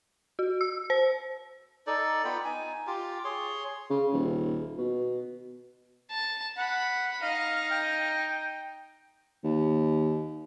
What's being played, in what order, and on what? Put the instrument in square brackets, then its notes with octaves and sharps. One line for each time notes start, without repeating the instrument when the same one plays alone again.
[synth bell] F#4
E6
C5
[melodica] D#4 A4 D5
B3 F4 G5 B5
D#4 G#5
F4 G4
G#4 C#5 C6
[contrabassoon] C#3
D#1
B2
[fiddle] A5
[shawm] F#5 [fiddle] B5
[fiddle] D#4 D#5 [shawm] F5
[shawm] G5
[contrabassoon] D#2